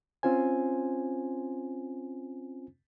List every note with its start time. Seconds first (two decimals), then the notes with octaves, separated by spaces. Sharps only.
0.23 C4 C#4 F4 C5 G#5